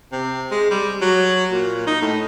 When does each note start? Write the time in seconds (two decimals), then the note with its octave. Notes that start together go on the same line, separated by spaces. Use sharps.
0.12 C3
0.51 G#3
0.71 G3
1.01 F#3
1.51 A#2
1.87 D#4
2.02 A2